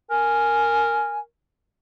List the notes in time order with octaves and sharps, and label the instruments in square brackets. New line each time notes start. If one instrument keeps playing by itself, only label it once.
[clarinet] A#4 [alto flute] G#5